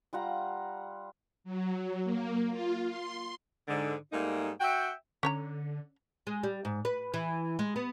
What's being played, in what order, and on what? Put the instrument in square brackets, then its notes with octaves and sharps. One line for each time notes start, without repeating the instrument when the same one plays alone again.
[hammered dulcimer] G3 F4 F#5 A#5
[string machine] F#3
A#3
F4
C6
[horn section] G#2 D3
G#2 G3 A3 A#3 D#4
F#4 E5 F#5 G5
[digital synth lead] D3 [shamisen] C#4 C#5 A#5
[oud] G#3
G3
G#2
B4
E3
G#3
B3